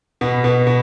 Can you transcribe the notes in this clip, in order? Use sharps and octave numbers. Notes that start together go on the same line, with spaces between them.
B2 B3
B2 B3
B2